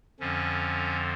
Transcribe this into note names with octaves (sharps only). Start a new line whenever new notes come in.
F2 D3 F3 C#4